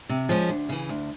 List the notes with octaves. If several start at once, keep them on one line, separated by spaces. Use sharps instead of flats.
C3
F3 G#3 C#4
D2
C#3 E3
D2